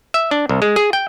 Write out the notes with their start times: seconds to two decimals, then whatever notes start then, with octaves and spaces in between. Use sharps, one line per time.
0.14 E5
0.31 D4
0.49 C2
0.62 G#3
0.76 G#4
0.93 G5